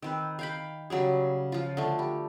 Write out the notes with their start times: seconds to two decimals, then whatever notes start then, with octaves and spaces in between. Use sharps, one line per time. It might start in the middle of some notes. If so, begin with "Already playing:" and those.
0.02 D#3 C4 B4
0.39 F5 G5 B5
0.90 C#3 F#3 G3 G#4
1.52 F3 F4
1.77 D3 A3
1.99 G3